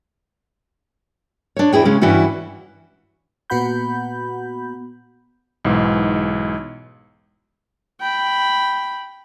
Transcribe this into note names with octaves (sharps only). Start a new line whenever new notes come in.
D4 C#5
E2 E4 G#4 G5
C#3 G#3 C#4
G2 E3 C#4 E4 F#4
A#2 B3 F#4 F#5 B5 G6
B1 G#2 E3 G#3
G5 B5